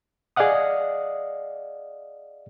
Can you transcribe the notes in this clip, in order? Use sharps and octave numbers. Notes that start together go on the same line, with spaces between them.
G#4 D5 D#5 F5 F#5 D#6